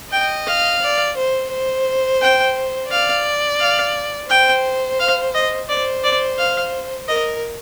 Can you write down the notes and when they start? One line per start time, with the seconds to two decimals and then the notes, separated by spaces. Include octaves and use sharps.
0.12 D#5 G5
0.47 F5
0.82 D5
1.17 C5
1.52 C5
2.22 G5
2.91 D5 F5
3.60 F5
4.30 C5 G5
5.00 F5
5.35 D#5
5.69 C5 D5
6.04 D5
6.38 F5
7.08 A#4 D#5